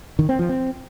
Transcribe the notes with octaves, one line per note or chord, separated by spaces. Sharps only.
D#3
C4
F3
C4